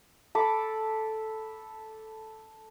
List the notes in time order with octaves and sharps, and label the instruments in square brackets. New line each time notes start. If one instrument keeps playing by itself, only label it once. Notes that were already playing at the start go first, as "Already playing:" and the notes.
[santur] A4 B5 D6